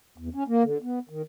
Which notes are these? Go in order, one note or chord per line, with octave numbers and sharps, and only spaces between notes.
E2
C#4
A#3
D3
B3
D#3